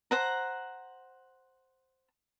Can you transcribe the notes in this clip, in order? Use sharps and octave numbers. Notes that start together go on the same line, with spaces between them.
C5 F#5 A#5